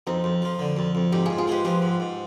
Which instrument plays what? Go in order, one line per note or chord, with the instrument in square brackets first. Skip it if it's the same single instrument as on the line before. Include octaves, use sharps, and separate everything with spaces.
[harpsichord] F2 [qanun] C4 D#4
[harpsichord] F2
F3
D3
F2
F2
[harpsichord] G#2 [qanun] D#4 G4
[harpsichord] G#2 [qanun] F4 G#4
[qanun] F4 G#4
[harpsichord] G#3 [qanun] G4 B4
[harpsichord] F3 [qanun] G4 B4
[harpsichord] G#2
G#2